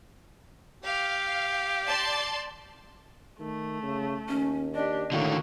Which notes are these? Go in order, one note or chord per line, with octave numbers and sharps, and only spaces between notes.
G4 F5
D5 A5 C6
D#3 A3
C#3
D#2 C#4
D4 G4 D#5
A2 D3 D#3 A#3 F#4